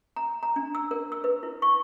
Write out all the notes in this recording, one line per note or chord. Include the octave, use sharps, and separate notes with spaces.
A#5
A#5
D4
E6
A#4
E6
B4
E4
C#6